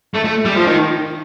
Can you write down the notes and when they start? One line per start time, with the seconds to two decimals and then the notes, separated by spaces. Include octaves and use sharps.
0.14 A3
0.24 A3
0.45 G3
0.56 F3
0.66 D#3